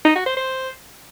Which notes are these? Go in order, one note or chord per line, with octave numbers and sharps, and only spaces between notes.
D#4
F#4
C5
C5